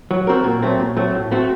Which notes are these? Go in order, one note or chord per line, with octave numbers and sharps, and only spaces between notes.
F#3
A3 C4 F#4 A#4
A#2
F#3 A3 C4
A#2
F#3 A3 C4
A2
A3 C4 F#4